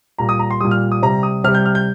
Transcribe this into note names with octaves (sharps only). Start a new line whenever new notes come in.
A#2 G3 A#5
D#6
A#5
C6
A#2 G3 D#6
F6
D#6
C3 G3 A#5
D#6
C3 G3 F6
G6
F6
G6